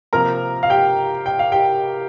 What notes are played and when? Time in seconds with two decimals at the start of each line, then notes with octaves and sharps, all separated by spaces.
0.13 C3 F3 A#3 A#4 A#5
0.63 F5
0.70 G4 G5
1.26 G5
1.39 F5
1.52 G4 G5